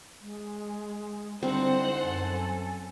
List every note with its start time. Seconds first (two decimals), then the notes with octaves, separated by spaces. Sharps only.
0.21 G#3
1.43 D3 G3 C4 D#4 E4 C5 F#5
1.99 F#2 A4 G#5